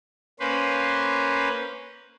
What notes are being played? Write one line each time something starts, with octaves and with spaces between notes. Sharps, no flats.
A#3 C#4 B4 C5